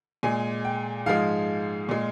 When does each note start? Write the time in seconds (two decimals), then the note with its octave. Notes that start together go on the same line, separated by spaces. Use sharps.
0.23 A#2 G#3 G#5
0.65 G5
1.06 G#2 F3 G#3 F5
1.89 A#2 G#3